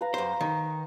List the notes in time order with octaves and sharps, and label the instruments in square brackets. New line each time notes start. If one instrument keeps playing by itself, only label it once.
[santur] B4 F5 A#5
[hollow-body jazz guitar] F#2 C5
D#3